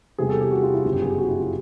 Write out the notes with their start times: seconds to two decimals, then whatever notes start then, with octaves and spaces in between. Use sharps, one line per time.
0.18 E2 C3 E3 G3 G#4
0.29 A4
0.41 G4
0.51 F#4
0.63 F4
0.73 E4
0.85 G1 F#2 C#3 F4
0.93 G4
1.02 G#4
1.09 G4
1.18 F#4
1.28 E4
1.39 F4